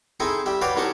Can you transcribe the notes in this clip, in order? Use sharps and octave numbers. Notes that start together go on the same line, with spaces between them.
C4 D#4 E4 G#4 A4 G#5
G3 G4 E5
F#4 B4 C#5 D5 F5 G5
C2 F#3 C#4 D#4 A5 C#6